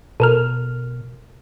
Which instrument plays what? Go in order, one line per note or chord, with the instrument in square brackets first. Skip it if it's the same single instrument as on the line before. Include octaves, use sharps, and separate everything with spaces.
[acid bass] B2 [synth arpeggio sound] A4 A#4 F6